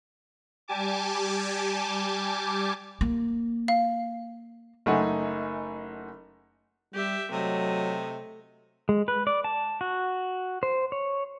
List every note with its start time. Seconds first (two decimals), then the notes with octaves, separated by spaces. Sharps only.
0.68 G3 G4 G#5 A5 D6
3.01 A#3
3.68 F5
4.86 F#1 A3 D#4 F#5 G#5
6.94 G3 G4 E5
7.31 C3 F#3 A3 D#5
8.89 G#3
9.08 B4
9.27 D5
9.44 A5
9.81 F#4
10.63 C5
10.92 C#5